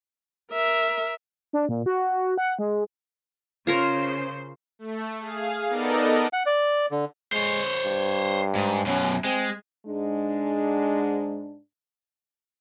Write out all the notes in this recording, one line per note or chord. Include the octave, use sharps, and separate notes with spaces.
A#4 E5
D4
A#2
F#4
F#5
G#3
C#3 F4 A#4 C5 C#5
A3
G#4 F5
B3 D#4 A4 A#4 D5 D#5
F#5
D5
D3
G#3 C5 C#5
G2
G#2
F#2 B2 C#4
G#3 C4
G#2 G#3 D4